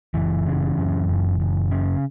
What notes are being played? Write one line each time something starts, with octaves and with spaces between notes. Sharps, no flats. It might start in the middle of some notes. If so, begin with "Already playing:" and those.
F#1 E3
C#3
F#2
F#1
F#1
C#3